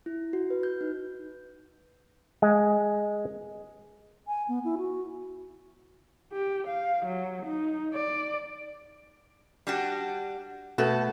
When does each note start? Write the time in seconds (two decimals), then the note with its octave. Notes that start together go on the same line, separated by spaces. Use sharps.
0.06 E4
0.33 F#4
0.50 B4
0.63 G6
0.81 D#4
2.42 G#3
4.27 G#5
4.48 B3
4.65 E4
4.78 F#4
6.33 G4
6.68 F5
7.05 F#3
7.46 D#4
7.94 D5
9.67 G3 D4 F#4
10.78 B2 A3 B3 F#4 A4